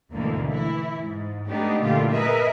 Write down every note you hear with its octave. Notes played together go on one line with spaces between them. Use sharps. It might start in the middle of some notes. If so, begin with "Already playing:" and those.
D2 G#2 B2 D3 E3 A#3
E3 E4
G#2
G#3 A3 B3 D4 D#4 G4
A#2 D3 E3 A3 F4 G4
G#4 A#4 B4 D#5 E5